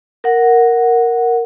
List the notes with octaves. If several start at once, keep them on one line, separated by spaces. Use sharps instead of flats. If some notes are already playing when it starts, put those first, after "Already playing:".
A#4 F#5